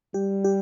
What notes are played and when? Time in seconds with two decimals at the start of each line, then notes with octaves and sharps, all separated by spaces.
0.14 G3 G4
0.44 G4